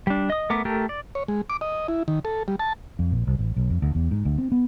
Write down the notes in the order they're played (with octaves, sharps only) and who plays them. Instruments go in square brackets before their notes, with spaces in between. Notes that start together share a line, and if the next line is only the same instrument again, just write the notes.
[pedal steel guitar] G3 D4
D#5 D#6
A3 B3 A#4 D6
A3 G4 A4 A#4
D5
[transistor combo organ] C#5
G#3
D6
D#5
E4
D#3
A4
G3
A5
[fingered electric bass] F2
A#1
C2
A1
B1
F2
D2
E2
G#2
D2
C4
B3